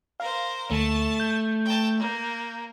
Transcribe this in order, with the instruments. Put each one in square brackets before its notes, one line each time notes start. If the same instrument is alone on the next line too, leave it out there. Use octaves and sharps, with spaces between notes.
[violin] A#4 C5 [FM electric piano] F5
[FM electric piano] D2 [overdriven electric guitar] A3 [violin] A5
[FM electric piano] G6
[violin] G5 A5
A#3